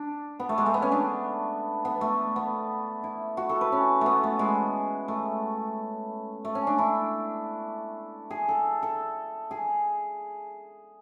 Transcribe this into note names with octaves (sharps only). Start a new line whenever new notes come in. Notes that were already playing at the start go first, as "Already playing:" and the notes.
Already playing: D4
B3
A3
G#3
A3
B3
C#4
D4
B3
A3
B3
E4
F#4
A4
B4
C#4
A3 B3
A3
G#3
A3
A3
C#4
D4
E4
G#4
A4
A4
G#4